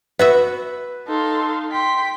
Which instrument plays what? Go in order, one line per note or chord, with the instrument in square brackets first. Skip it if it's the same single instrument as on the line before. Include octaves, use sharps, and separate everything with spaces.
[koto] B3 F#4 E5 [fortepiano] B4
[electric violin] D#4 F5 [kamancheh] A4 C6
[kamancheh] G5 C6 [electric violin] B6